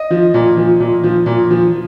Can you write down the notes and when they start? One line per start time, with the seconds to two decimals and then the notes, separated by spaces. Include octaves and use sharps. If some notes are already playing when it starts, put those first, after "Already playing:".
Already playing: D#5
0.10 F3
0.34 A#2
0.57 F3
0.80 A#2
1.03 F3
1.26 A#2
1.51 F3